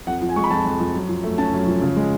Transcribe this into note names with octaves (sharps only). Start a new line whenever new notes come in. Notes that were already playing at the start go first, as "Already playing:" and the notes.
F2 F#5
F3
G#5
G#3 C#6
B5
F2 A5
F2
F3
F#2
F3
A3
C#4 A5
F#2
F3
C#3
G#3